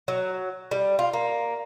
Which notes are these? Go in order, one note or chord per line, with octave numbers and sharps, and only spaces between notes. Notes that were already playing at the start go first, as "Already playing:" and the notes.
F#3
G3
F4
A#3